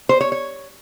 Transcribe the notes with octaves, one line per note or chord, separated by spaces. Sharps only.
C5
C#5
C#5